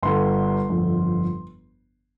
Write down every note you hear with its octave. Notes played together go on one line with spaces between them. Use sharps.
G1 G2 D3 C6
G1 F2 D3